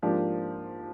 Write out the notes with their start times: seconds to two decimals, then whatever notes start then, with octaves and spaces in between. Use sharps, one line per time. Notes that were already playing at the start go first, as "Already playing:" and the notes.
0.02 G#2 F3 A#3 D4 G4